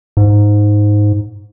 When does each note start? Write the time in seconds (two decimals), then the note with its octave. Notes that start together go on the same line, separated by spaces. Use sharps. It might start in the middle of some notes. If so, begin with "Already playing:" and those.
0.17 G#2